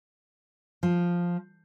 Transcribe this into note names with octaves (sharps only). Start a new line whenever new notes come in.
F3